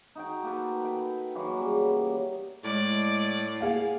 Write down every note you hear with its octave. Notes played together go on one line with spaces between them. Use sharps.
D#4 F#4 G5
A#3 A4 B4
B4 G5
E3 F#3 A#3 F#4
C#3 G3
A2 G#3 D5
A#3 G#4 F5 F#5